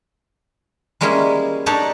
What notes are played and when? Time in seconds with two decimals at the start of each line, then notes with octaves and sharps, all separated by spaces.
1.01 G3 G#3 A#3 C#4 E4 G#4
1.66 D4 D#4 G4 A4 C#5 D5